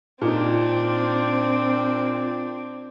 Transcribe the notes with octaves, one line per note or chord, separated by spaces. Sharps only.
A#2 C4 D4 D#4